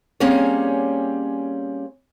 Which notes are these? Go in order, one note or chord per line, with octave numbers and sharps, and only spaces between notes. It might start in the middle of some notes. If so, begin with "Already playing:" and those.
G3 A#3 C4 C#4 G#4 C#5